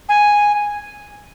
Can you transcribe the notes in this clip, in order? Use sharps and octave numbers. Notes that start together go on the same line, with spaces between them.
G#5